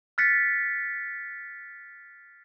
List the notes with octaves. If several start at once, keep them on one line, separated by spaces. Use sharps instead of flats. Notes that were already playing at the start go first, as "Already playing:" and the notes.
F6 F#6 A6 B6 C#7